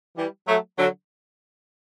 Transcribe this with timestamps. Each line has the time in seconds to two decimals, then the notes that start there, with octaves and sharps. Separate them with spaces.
0.17 E3 G3
0.47 F#3 A3
0.77 D3 F#3